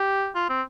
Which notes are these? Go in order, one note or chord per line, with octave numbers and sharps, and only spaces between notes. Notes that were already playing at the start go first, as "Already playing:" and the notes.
Already playing: G4
F4
C4